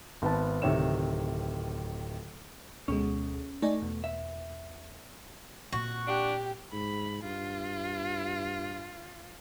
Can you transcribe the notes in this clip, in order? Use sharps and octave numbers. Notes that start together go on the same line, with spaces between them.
G#1 B3 A5
D1 C3 D#3 C#5 E5 E7
D2 B2 G#3 C#4
A3 D#4 D5 G#5
E2 B2
E5
A#2 C4 F#4
D4 G4
G#2 B5
G2 F4